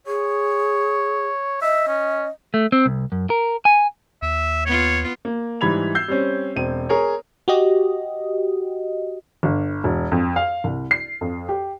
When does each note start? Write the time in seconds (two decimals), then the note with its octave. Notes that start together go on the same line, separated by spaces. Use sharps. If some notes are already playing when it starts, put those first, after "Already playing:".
0.07 G#4 C#5
1.62 D#5 E5
1.88 C#4
2.54 A3
2.72 C4
2.86 C2
3.12 F#2
3.30 A#4
3.65 G#5
4.22 D#2 E5
4.66 B3 F4 C#5
5.25 A#3
5.61 G#2 E3 G3 B5 G#6 F7
5.95 E6 G6 C7
6.08 G3 C4 C#4
6.56 E1 C4 D#7
6.89 G#4 A#4 C#5
7.48 F#4 G4 D#5
9.43 G1
9.84 E1
10.12 F2
10.36 F5
10.64 C2
10.91 C7
11.21 F2
11.49 G4